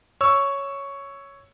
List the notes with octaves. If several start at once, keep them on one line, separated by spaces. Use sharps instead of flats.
C#5 C#6 E6